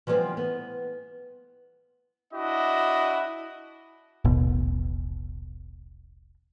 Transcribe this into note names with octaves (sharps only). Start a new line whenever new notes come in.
E3 F3 G3 A3 B3 C4
B3
D4 E4 F#4 D#5
D#1 A1 B2